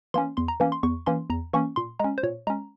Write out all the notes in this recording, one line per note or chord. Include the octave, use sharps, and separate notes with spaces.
E3 A#3 C#4 C6
E2 C6
A#5
E3 A#3 C#4
C6
E2 C#6
E3 A#3 C#4 C6
E2 A#5
E3 A#3 C#4 C#6
A#2 C6
G#3 C#4 A#5
C5
A#2 C#5
G#3 C#4 A#5